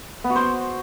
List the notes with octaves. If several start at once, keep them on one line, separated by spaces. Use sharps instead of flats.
B3
F#4
C5